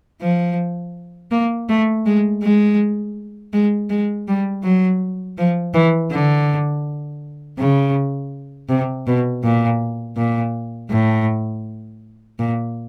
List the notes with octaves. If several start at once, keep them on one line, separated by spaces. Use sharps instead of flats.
F3
A#3
A3
G#3
G#3
G#3
G#3
G3
F#3
F3
E3
D3
C#3
C3
B2
A#2
A#2
A2
A#2